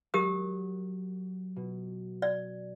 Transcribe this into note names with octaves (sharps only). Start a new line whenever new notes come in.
F#3 G4 A#4 D#6
B2
D5